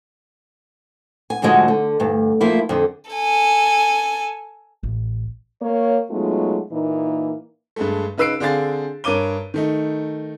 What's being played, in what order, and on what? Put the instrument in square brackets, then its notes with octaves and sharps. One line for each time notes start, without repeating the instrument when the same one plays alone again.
[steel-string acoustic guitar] G#5
G#2 D3 F3 G#3 F#4
D3
D2 G2
F3 A#3 E4
F2 D3
[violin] A4 G#5
[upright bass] A1
[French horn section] A#3 C#5
F#3 G#3 A3 B3 D#4 F4
A#2 E3 A#3 D#4
[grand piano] G2 G#3 A3
C#3 D#4 B4 E6 C7 D7
D3 C4 D4 G#4 F5 A6
G2 A#4 C#5 D6 D#7 G7
D#3 A3 D#4